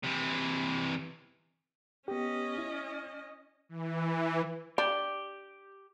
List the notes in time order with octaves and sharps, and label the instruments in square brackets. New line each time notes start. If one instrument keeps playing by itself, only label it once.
[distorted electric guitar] C3 E3
[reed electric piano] B3 G4 [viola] C#4 D#5
[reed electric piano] E4
[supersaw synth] E3
[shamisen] D4 [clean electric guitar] G4